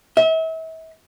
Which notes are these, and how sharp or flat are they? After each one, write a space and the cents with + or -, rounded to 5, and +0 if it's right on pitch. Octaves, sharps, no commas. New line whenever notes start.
E5 -40